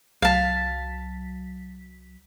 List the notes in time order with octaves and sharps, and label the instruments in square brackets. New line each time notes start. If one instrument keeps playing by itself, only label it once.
[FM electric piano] C2 F#3 B6 [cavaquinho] F5 A5